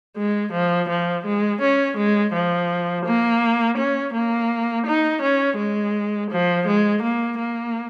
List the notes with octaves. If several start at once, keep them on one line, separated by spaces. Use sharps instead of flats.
G#3
F3
F3
G#3
C#4
G#3
F3
A#3
C#4
A#3
D#4
C#4
G#3
F3
G#3
A#3
A#3